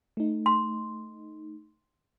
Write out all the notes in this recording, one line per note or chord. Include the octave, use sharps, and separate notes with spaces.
A3 D#4
C6